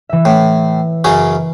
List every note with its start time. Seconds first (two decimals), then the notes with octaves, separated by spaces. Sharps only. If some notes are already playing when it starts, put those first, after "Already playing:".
0.09 E3 E5
0.25 A2
1.04 F#2 C#3 C#4